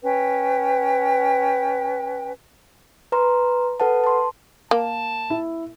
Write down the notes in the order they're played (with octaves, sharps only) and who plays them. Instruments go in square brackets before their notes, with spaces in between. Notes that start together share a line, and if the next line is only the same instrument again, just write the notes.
[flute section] C#4 B4 G5
[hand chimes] B4 A#5 C6
A4 B4 F#5 A5
A5 C6
[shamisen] A#3 [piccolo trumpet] A5
[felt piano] E4